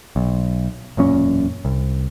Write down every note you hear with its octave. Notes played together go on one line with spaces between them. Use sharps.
B1
E1 F#2 A#2 C#4
C2